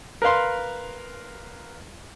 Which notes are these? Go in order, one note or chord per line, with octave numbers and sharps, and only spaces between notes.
A#4 B4 F5 C6